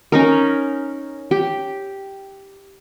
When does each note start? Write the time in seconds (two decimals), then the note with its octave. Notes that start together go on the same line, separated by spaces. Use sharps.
0.12 C#4 D#4 A#4
1.31 G4